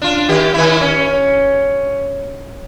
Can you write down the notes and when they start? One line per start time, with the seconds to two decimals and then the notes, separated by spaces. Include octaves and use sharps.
0.02 D4 F4
0.29 D#3 G4
0.54 D#3 E4
0.81 C#4